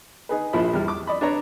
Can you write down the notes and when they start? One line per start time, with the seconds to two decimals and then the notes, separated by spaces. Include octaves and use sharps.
0.29 D#4 G#4 B4
0.53 A#1 F3 E4 B5
0.73 E2 G3 F6
0.88 D6
1.07 D5 D#5 B5
1.21 D4 B4 C#5 A#5